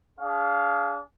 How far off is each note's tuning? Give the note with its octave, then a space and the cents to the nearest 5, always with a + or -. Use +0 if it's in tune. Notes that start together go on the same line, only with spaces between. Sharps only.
D4 -35 G#4 +0 F5 +0